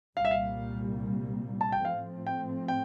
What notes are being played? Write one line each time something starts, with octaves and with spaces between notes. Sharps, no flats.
C2 A#2 G3 A#3 F5
E5
F5
A5
G5
A2 F3 A3 C4 F5
G5
G5